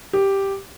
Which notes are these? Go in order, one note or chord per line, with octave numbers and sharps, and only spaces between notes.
G4